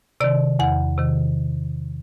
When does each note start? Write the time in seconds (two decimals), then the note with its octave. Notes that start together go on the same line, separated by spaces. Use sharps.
0.20 C3 D#3 D5
0.59 E2 F#5
0.98 C3 D#3